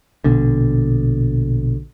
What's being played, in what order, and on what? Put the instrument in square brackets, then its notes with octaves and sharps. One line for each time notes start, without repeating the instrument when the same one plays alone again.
[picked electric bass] A#1 B2 D3